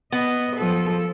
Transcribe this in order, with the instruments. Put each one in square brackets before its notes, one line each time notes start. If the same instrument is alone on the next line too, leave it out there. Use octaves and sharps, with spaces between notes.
[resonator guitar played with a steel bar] B3 [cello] D#5
[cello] F3 A4